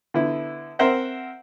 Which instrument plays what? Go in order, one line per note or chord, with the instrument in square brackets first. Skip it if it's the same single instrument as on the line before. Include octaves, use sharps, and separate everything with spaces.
[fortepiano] D3 B3 E4
C4 A#4 C5 E5 F#5